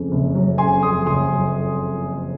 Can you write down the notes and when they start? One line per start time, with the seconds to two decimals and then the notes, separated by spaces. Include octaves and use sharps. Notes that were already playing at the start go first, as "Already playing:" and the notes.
Already playing: F2 C#3
0.11 F#1
0.35 F#3
0.58 C#3 G#5 C6
0.82 F2 C6 D#6
1.06 F#1 C6 D#6
1.31 F#3